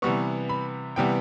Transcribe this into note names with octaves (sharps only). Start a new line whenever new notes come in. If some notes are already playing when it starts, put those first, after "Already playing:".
C3 E3 G3 B3 C#6
B5
C3 E3 G3 B3 G5